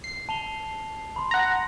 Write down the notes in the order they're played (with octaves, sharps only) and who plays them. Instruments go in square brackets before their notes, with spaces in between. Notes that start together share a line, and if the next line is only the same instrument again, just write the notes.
[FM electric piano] C7
[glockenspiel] A5 F7 G7
B5 C6
[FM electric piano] F#5 A#5